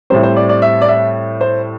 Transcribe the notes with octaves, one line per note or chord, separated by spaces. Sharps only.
A2 G3 C4 C5
C5
D5
D5
E5
D5
E5
C5